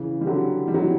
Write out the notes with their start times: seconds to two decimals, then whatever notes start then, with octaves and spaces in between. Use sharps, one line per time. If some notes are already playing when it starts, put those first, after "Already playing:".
Already playing: C#3 E3
0.21 G3
0.27 D3 F#3
0.68 G3
0.74 F#3
0.82 E3 G3